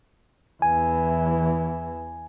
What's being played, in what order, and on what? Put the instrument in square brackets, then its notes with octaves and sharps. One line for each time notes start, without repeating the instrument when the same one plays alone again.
[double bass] E2 E3 [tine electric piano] G#5